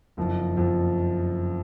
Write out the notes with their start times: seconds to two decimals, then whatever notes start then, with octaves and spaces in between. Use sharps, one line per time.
0.17 F#1 F2 F3
0.57 F#1 F2 F3